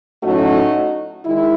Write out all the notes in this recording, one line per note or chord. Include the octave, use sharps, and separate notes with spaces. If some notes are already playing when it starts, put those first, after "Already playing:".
A2 F#3 A3 C#4 D#4 F#4
D#3 G#3 E4